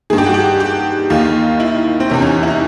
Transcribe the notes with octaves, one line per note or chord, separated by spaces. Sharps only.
G2 D#3 G#4
G4
F#4
G4
G4
D#2 D#3 F4
E4
C4
E2 C3 D#3 C#4
C#4
E4
D#4